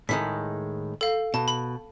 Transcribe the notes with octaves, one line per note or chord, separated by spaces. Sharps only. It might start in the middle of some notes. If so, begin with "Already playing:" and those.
A2 D#3 G#3 B6
A4 F5
B2 A5
B5